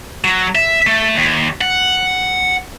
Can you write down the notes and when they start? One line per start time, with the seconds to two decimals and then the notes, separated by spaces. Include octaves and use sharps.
0.24 F#3
0.55 E5
0.87 A3
1.15 D#2
1.61 F#5